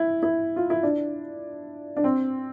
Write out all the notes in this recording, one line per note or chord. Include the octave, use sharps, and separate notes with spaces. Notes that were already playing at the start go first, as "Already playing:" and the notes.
Already playing: E4
E4
F4
E4
D4
D4
C4